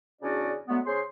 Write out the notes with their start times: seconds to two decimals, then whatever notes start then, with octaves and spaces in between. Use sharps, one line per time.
0.22 E2 C#3 C#4 D4 F#4 D5
0.68 D3 F#3 G#3 A3 B3
0.85 C#3 G#4 C5 C#5 C6